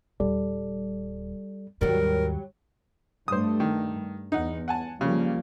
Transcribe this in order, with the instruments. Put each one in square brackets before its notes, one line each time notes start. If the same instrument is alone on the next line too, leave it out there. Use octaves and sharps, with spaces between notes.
[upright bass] D#1 [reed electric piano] G3 A4 D5
[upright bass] D#2 G#2 [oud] F#3 G3 [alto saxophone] A#4
[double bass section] G2 G3 A3 [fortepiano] C5 D#6
[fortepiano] D#3
[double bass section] E2 [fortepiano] D#4 F#5
[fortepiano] F#5 G#5 A5
[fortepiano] C#3 [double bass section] F3 G3 A#3